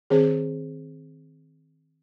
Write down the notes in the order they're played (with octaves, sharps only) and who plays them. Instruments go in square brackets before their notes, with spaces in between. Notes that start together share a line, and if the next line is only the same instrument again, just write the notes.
[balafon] D#3 C4 G#4 C5